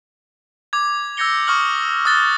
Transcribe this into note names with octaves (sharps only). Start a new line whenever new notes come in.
D6 G#6
E6 G6 G#6 A#6 C#7 G7
C#6 D#6 F6 F#7
D#6 F#6 A6 G7